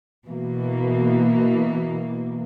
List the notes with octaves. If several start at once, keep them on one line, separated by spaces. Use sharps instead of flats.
B2 E3 A#3